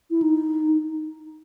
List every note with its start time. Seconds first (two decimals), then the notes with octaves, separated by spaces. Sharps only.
0.10 E4
0.22 D#4